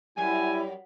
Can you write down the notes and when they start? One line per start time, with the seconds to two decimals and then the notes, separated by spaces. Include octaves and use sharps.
0.18 F#2 G3 E4 G#5